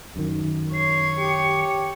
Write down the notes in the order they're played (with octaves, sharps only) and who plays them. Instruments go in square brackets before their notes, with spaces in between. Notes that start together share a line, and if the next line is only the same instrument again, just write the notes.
[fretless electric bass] F#2 D#3
[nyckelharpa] C#5 [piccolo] C7
[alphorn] G4 [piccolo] C#7